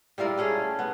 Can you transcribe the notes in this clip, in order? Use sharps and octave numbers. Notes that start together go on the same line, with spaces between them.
G3 E4 F4 A#4
A3 C#4 G#4
B3